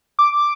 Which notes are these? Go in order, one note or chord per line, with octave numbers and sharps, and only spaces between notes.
D6